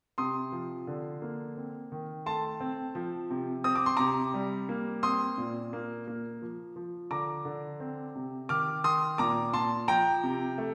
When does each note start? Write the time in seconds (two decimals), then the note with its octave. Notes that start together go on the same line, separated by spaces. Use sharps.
0.18 C3 C6 D#6
0.52 F3
0.87 D3
1.22 A#3
1.57 C4
1.92 D#3
2.26 A3 A5 C6
2.60 C4
2.95 F3
3.30 C3
3.64 C4 D#6
3.76 D6
3.86 C6
3.97 C3 A#5 D6
4.34 G3
4.69 A#3
5.03 C4 C6 D#6
5.38 A#2
5.73 A#3
6.08 A#3
6.42 F3
6.76 F3
7.11 D3 A#5 D6
7.45 D3
7.80 C4
8.15 C3
8.49 D#3 D6 F6
8.84 D#3 C6 D#6
9.18 A#2 A#5 D6
9.53 A#2 A5 C6
9.88 F3 G5 A#5
10.23 C3
10.58 A3